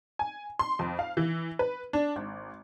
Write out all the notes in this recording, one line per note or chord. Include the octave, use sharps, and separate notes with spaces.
G#5
C6
F2
F5
E3
B4
D4
G#1